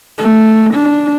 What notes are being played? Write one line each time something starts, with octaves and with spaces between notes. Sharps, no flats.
A3
D4